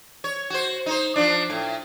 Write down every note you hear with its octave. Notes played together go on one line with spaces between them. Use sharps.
C#5
F#4 C5
D#4 C5
F3 D4
A2